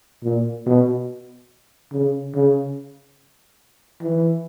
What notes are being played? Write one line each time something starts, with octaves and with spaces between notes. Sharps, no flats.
A#2
B2
C#3
C#3
E3